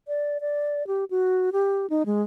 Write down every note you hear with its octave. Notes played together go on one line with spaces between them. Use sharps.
D5
D5
G4
F#4
G4
D#4
G#3